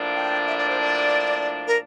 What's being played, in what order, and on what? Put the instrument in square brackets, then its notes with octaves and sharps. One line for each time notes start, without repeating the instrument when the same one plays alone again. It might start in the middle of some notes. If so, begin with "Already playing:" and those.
Already playing: [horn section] A2 F3 A#3 D4
[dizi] G5
E5
D5
C5
D5
A#4